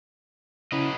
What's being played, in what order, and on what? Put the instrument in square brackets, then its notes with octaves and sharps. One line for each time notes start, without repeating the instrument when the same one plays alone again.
[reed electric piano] C#3 C#4 E4 [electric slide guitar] F#3 B4 D#5